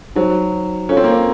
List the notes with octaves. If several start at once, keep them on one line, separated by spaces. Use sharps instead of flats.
F#3 D#4 F#4 C5
C#4 F4 A4 C#5 F5
C4
A#3
C4